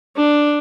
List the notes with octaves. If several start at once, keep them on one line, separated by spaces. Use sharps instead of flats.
D4